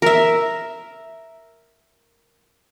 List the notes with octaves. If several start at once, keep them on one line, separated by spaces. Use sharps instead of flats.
A#4 E5